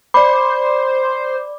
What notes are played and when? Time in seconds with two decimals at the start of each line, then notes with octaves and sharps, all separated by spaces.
0.14 C5 D5 B5 D6